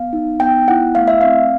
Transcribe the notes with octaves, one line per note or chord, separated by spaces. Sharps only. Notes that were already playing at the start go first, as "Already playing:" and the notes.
Already playing: B3 F5
D#4
B3 G5
E4 F#5
A3 F5
E5
C4 F5